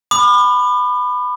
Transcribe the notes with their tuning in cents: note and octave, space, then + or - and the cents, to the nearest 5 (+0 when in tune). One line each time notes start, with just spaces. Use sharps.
B5 +10 D6 +45